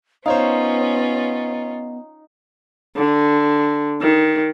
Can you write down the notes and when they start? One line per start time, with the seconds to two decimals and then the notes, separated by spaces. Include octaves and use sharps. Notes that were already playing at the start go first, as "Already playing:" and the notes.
0.26 B3 C#4 D#4 F4 C5 C#5 F5
2.96 D3
4.01 D#3